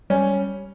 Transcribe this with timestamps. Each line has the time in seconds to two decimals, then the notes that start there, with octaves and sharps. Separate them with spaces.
0.10 G3 C#4